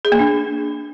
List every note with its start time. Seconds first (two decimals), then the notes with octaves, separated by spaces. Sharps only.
0.05 G#4
0.12 A#3
0.19 D4